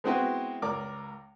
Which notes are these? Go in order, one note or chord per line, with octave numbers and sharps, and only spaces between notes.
G#3 B3 C4 E4 F#4 B4
C#2 A#4 D5 D6